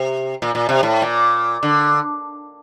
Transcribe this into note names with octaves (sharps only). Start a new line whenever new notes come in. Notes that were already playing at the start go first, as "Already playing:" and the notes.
Already playing: C3
A#2
A#2
C3
A2
A#2
D3